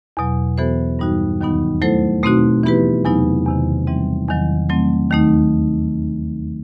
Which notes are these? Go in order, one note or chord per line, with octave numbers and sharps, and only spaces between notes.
E2 B2 F#3
E3 B3 F#4 A4 C5
G2 E3 G3 D#4 F#4
D#2 D#3 F#3 B3 D#4
F#3 A3 E4 A4 C5
B2 A3 C4 D#4 F#4
E3 B3 E4 G4 B4
E2 C3 F#3 B3 D#4
E2 C3 D#3
E3 G3 C4
E2 D#3 F#3
F#3 A3 C4
D#2 D#3 A3 D#4